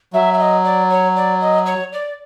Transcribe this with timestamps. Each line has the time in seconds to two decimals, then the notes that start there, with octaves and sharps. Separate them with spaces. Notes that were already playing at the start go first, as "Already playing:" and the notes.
0.13 F#3 E5
0.34 E5
0.39 D#5
0.64 D5
0.90 C#5
1.16 D5
1.41 D#5
1.66 C#5
1.93 D5